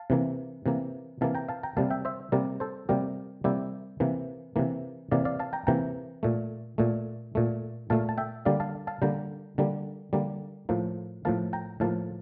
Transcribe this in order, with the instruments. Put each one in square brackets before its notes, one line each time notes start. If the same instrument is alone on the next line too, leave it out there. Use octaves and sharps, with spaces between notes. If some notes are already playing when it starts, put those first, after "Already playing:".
Already playing: [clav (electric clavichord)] F5 A5
C3 E3 A#3
C3 E3 A#3
C3 E3 A#3 F5 A5
G5 A#5
F5 A5
G5 A#5
C3 G3 A#3 F5 A5
E5 G5
C5 E5
C3 G3 A#3 A#4 D5
A4 C5
C3 G3 A#3 G4 A#4
C3 G3 A#3 E4 G4
C3 E3 A#3
C3 E3 A#3
C3 E3 A#3 D5 F5
D5 F5
F5 A5
G5 A#5
C3 E3 A#3 G5 A#5
A#2 A3
A#2 A3
A#2 A3
A#2 A3 F5 A5
A5
E5 G5
D3 G3 A#3 D5 F5
F5 A5
F5 A5
D3 G3 A#3 G5 A#5
D3 G3 A#3
D3 G3 A#3
A2 F3 A#3
A2 F3 A#3 F5 A5
G5 A#5
A2 F3 A#3 F5 A5